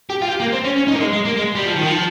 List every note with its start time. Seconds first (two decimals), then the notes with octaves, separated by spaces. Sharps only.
0.10 G4
0.22 F4
0.28 G4
0.40 A#3
0.53 C4
0.64 C#4
0.76 C#4
0.88 D#4
0.96 A#3
1.00 G#3
1.13 G#3
1.25 A#3
1.37 G#3
1.55 G3
1.65 F3
1.76 D#3
1.86 F3